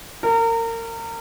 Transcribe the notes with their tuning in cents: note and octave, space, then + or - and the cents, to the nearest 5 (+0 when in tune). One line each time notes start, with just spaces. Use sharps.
A#4 -30